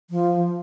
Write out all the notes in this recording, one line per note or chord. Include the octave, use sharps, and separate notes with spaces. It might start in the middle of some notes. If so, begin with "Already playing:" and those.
F3